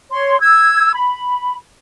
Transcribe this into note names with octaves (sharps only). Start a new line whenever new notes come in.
C#5 C6
E6 G#6
B5